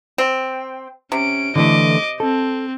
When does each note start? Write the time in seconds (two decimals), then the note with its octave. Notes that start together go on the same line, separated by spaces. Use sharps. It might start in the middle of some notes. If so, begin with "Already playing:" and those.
0.18 C4
1.12 C3 C#4 D7
1.56 D3 E3 A3 D#5 D6
2.20 C4 A4